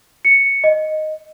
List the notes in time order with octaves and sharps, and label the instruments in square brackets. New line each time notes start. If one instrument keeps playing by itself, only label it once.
[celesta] C#7
D#5